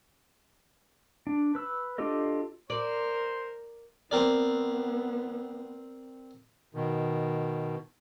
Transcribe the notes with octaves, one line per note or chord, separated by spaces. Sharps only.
D4
B4 E6
D4 F4 G4 A4 D#5
A#4 C5 D5
B3 C4 A#4 D5
B2 D#3